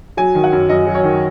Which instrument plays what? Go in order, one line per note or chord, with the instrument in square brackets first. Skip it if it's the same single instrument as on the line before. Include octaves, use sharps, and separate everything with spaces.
[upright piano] F#3 G#5
D#3
F#5
F#2
F#2 D#5
F#3
C#5
D#3